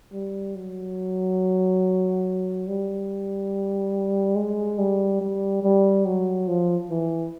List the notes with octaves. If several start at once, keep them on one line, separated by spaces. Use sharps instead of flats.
G3
F#3
G3
G#3
G3
G3
G3
F#3
F3
E3